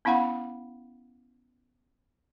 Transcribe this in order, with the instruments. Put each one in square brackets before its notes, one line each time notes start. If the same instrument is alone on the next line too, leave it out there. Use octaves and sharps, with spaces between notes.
[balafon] B3 C#4 E4 F5 F#5 B5